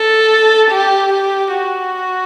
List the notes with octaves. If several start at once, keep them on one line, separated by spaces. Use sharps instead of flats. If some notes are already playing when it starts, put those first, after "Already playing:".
Already playing: A4
G4
G4
F#4